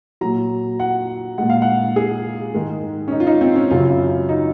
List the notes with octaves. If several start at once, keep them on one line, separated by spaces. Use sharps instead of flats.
A#2 F#3 A#5
F#5
A#2 G#3 F#5
F5
F#5
G#4
G#2 D#3 G#3
C#4
D#4
F4
D#4
C4
C#4
F#2 C#3 F#3 F4
D#4